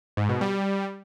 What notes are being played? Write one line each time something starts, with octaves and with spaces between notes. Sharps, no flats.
G#2
B2
G3